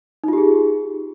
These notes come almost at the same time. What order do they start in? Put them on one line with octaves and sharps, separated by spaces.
D#4 F4 G4 G#4